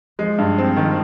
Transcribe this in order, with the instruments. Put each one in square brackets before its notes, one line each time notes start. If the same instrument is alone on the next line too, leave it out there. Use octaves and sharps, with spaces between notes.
[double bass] F3 [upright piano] G#3
[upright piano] G2
C4
D#3